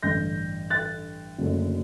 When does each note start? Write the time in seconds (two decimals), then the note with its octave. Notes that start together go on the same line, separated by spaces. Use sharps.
0.03 A1 G2 D3 G6 A#6
0.70 F#6 A6
1.39 F#1 F#2 D3 F#3 A3